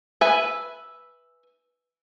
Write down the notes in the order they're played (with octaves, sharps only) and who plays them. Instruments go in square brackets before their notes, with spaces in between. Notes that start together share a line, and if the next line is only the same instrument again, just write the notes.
[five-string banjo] B4 E5 G#5